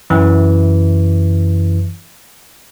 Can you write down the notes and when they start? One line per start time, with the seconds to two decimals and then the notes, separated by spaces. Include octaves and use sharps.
0.10 F#2 E3